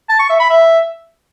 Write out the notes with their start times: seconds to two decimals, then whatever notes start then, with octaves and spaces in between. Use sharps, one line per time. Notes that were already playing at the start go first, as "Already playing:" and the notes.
0.09 A5
0.19 C#6
0.30 E5
0.40 B5
0.50 E5